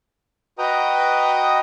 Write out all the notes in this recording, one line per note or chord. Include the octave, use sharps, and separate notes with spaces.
F#4 B4 D#5 G5 A#5 D#6